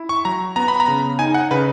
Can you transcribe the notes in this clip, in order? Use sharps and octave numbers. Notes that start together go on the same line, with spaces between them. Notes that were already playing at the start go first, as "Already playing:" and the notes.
Already playing: E4
C#6
F#3 A#5
B3 A#5
B5
A#5
C#3
D#4 G#5
F#5
C#3 B4